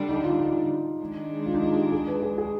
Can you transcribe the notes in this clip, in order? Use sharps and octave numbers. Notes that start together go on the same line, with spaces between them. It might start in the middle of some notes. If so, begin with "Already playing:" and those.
Already playing: D3 G3 D4
D#4
F4
D#4
D#3 G#3 D4
F4
D#4
F4
G4
G#4
B4
G#4
G#4